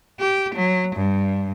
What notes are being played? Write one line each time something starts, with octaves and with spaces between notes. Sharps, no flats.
G4
F#3
G2